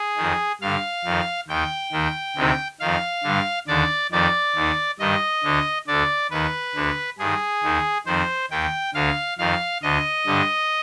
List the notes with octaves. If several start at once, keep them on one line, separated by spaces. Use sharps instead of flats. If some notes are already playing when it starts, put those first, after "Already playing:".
Already playing: G#4
F2 D#3
G2 D3 F5
F2 D#3
D#2 D#3 G5
D#2 D#3
D2 C3 D#3
F2 D#3 F5
G2 D3
D#2 D3 D5
F2 D#3 D5
D#2 D#3
G2 D#3 D#5
D2 D3
D2 D3 D5
D#2 D#3 B4
D2 D3
G2 D#3 G#4
D#2 D#3
F2 D#3 C5
D#2 D#3 G5
D2 D3 F5
F2 D#3 F5
D2 D3 D#5
G2 D3